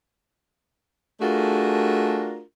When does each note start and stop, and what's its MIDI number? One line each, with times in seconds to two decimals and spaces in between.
1.20 2.40 57
1.20 2.40 62
1.20 2.40 65
1.20 2.40 66
1.20 2.40 68
1.20 2.40 70